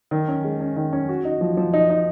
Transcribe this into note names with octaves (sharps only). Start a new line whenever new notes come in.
D#3
C#4
G#3
C#4
D#3
C#4
F#4
D#4
F3
F3
D#4
D#4